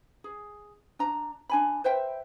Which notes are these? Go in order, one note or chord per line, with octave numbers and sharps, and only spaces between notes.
G#4
D4 A#5
D4 G#5 B5
B4 C5 E5 G5